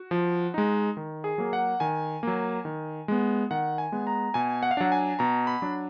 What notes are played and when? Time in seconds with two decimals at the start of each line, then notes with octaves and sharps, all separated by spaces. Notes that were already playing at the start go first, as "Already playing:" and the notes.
Already playing: F#4
0.11 F3
0.54 G#3 D#4
0.97 D#3
1.24 G#4
1.38 F#3 A#3
1.53 F#5
1.80 D#3 G#5
2.23 F#3 A#3
2.65 D#3
3.08 G#3 B3
3.51 D#3 F#5
3.78 G#5
3.92 G#3 B3
4.07 A#5
4.34 B2 G#5
4.63 F#5
4.71 F5
4.77 F#3 D4 F#5
4.92 G#5
5.19 B2 A#5
5.47 B5
5.62 F#3 D4